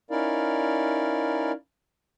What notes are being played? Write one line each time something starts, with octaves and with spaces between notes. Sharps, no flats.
C#4 D#4 E4 A#4 D5 F5